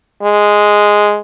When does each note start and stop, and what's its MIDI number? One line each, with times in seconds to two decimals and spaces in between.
0.23 1.20 56